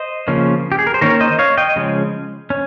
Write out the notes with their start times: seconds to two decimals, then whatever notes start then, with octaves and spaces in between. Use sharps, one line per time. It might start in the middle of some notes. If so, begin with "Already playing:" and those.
Already playing: C5 D#5
0.28 C#3 F3 A#3 C#4
0.72 G4
0.79 G#4
0.87 A#4
0.94 C5
1.01 D#3 A#3 C#4 A#4 C#5
1.21 C5 D#5
1.39 C#5 F5
1.57 D#5 G5
1.76 C#3 F3 G#3 C#4
2.50 C#4